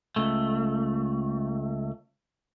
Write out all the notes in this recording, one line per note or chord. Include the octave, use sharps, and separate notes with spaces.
C#2 A3